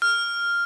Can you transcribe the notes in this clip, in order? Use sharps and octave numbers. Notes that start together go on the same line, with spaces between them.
F6